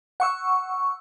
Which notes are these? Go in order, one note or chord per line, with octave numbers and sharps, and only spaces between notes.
F#5 C#6 E6